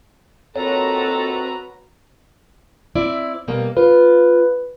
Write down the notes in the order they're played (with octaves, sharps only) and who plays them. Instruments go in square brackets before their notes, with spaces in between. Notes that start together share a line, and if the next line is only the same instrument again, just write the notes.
[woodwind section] A#2 D#3 A4 [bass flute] C4 [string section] F#4 B4 A#5 [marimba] C#5
[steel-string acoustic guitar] C4 E4 D5
B2 G3 A#3
[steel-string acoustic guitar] F4 [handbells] B4